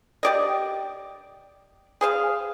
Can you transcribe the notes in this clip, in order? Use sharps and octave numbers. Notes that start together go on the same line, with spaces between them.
G4 D5 D#5
G#4 C5 F5